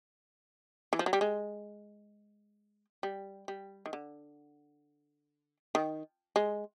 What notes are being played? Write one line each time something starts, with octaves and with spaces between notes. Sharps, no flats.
E3
F3
F#3
G3
G#3
G3
G3
D#3
D3
D#3
G#3